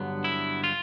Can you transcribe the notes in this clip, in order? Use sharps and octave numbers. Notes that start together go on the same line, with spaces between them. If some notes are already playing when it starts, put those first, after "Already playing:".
Already playing: G2 D3 F#3 B3
E4
F4